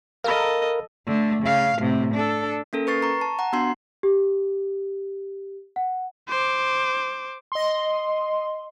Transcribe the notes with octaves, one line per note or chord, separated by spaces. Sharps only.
A4 A#4 D#5 F5 B5
D3 A3
C#3 F5
A2 C3
D4 A4
A#3 C#4 A4 A#4
B4 C#6 A6 C7
A#5 C#6
A5
F#5 A#5
B3 D4 F#4 C6 C7
G4
F#5
C5 D6
D#5 C6